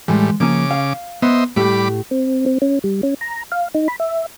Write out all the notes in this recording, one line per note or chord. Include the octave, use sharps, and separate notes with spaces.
A2 E3 G3 G#3
C#3 F3 A#3 C#4 D6
F5
B3 C5 D#5 E5
A2 G3 A3 G4 B5 D6
C4
C4
C#4
G3
C#4
A#5
F5
D#4
B5
E5